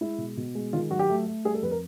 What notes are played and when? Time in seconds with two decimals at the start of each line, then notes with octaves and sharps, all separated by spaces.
0.01 G#3 E4
0.18 B2
0.37 B2
0.55 G#3
0.73 D#3 F4
0.91 F#3 F#4
0.99 G4
1.09 A3
1.26 A3
1.45 G3 G#4
1.54 A4
1.62 F2 B4
1.71 A#4